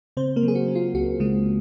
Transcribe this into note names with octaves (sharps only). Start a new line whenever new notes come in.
C#3 C4 C5
A#3 A#4
F#3
G#4
F#4
C#4
F4
C#2 F#4
C#3 G#3 G#4